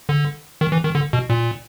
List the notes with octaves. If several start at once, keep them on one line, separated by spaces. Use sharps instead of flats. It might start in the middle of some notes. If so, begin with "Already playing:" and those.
D3
D#3
E3
D#3
D3
B2
A#2